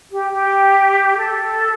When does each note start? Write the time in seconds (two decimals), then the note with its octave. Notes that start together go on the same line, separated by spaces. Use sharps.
0.12 G4
0.33 G4
1.18 A4